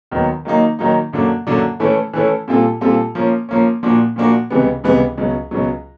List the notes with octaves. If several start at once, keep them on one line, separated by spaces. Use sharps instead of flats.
D#2 D#3 F#3 B3
D#3 F#3 A#3 D#4
D#3 F#3 A#3 D#4
F#2 D3 F#3 A#3 D4
F#2 D3 F#3 A#3 D4
E3 A3 C#4 E4 A4
E3 A3 C#4 E4 A4
A#2 G3 C4 F4 A4
A#2 G3 C4 F4 A4
F3 A#3 C#4
F3 A#3 C#4
A#2 F3 A#3 D4 F#4
A#2 F3 A#3 D4 F#4
C#2 C3 E3 G3 B3
C#2 C3 E3 G3 B3
C#2 B2 F#3
C#2 B2 F#3